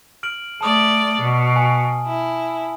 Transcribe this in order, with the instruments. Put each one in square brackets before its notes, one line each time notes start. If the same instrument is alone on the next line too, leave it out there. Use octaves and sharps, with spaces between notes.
[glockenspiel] F6 D7 F#7
[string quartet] A3 D5 [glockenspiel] A5 D#6
[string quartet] B2
[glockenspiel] G#5
[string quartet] E4